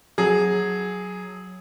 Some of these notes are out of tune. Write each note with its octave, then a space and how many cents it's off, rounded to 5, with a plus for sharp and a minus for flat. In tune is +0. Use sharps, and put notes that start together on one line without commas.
F#3 +0 G#4 +0 A5 +0